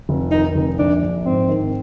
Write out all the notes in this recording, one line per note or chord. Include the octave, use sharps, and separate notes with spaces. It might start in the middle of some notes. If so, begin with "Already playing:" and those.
F1
D#3 D#4
F1
A#1 D4
A#1
G#2 C4
D#3